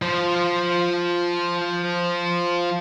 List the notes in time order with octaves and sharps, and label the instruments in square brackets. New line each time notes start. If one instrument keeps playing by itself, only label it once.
[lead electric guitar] F3 C5